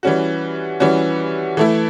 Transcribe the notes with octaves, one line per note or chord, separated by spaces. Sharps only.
E3 G3 C#4 F#4
E3 G3 C#4 F#4
E3 A3 E4